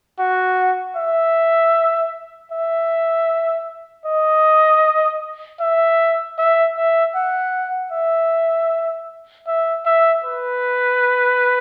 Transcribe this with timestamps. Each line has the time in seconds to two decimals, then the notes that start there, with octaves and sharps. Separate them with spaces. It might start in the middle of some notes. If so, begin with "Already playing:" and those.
0.19 F#4
0.96 E5
2.52 E5
4.06 D#5
5.60 E5
6.38 E5
6.77 E5
7.15 F#5
7.92 E5
9.47 E5
9.86 E5
10.24 B4